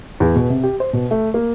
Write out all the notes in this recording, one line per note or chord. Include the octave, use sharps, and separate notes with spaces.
E2
B2
C3
G4
C5
B2
A3
A#3